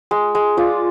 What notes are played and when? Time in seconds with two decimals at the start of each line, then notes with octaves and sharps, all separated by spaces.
0.11 G#3
0.35 G#3
0.57 F4 D5